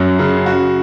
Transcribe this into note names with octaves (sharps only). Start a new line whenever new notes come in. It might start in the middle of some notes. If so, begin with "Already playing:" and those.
Already playing: F#2 F#3
C#3
F#4